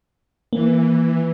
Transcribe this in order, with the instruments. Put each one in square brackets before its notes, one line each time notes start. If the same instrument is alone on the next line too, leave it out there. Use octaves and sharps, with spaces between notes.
[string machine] E3 [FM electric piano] A#3